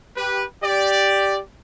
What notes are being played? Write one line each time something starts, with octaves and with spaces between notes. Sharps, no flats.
G4 B4
G4 D5